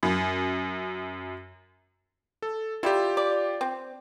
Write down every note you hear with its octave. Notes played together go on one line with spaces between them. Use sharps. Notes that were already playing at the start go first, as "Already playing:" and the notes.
F#2
A4
G3 E4 F4 G4
D5
C4